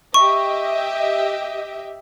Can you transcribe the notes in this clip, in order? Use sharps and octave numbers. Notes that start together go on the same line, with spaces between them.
G4 D#5 E5 C#6